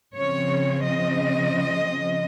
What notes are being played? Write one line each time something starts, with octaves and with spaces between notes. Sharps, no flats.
C#3 F3 C4 C#5
D#5